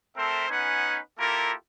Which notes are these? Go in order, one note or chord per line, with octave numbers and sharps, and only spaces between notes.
A3 C4 A4 A#4 C5 E5
B3 C#4 D#4 B4 F#5 G#5
A#3 E4 F4 G4 A4 A#4